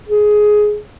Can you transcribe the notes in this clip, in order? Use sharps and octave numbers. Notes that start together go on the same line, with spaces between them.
G#4